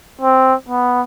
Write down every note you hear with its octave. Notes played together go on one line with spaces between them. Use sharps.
C4
B3